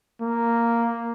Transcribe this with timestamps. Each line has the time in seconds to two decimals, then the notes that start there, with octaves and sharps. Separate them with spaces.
0.21 A#3